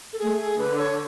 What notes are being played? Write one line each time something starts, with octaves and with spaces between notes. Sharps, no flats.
A4
A3 G#4
G#4
D3 B4
C#5